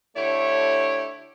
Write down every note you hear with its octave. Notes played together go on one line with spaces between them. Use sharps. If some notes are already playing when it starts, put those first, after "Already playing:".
D3 A3 E4 G4 C#5